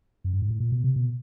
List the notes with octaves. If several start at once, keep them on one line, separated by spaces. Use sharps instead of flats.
F#2
G2
G#2
A2
A#2
B2
C3
B2